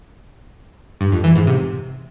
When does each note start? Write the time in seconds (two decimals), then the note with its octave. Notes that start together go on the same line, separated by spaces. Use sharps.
1.01 G2
1.12 F2
1.24 E3
1.36 G#2
1.47 C3